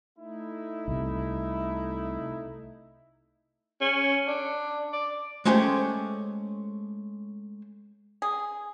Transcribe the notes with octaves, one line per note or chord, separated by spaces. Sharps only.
A3 D#4 E4
C2 C3
C#4
D4
D5
G#3 A3 C#4 G4 C5 C#5
G#4